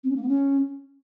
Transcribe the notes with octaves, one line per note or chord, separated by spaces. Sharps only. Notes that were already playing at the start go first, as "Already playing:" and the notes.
C4
C#4
A#3
B3
C#4